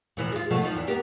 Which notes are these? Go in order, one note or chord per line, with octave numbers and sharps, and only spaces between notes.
A#2 E3 F3
G#3 F4
B2 F3 A3
F3 D#4 F4
E2 E3
A#3 B3 G4